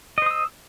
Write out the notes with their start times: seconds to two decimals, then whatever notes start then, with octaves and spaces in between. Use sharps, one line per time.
0.18 D#5
0.22 C5
0.26 D#6
0.31 E6